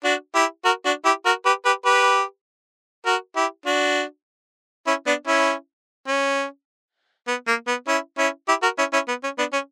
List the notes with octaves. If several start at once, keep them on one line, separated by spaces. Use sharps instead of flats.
D4 F#4
E4 G4
F#4 A#4
D4 F#4
E4 G4
F#4 A#4
G4 B4
G4 B4
G4 B4
F#4 A#4
E4 G4
D4 F#4
C#4 E4
B3 D4
C#4 E4
C#4
B3
A#3
B3
C#4 E4
C#4 E4
E4 G4
F#4 A#4
C#4 E4
C#4 E4
B3
C#4
B3 D4
C#4